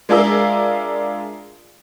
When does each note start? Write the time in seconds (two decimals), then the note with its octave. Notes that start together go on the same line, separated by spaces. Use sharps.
0.09 G#3 D4 F4 G#4 A#4 E5